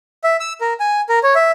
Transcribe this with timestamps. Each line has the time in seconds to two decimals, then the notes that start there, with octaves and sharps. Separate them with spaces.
0.24 E5
0.40 E6
0.61 A#4
0.80 G#5
1.09 A#4
1.23 C#5
1.35 E5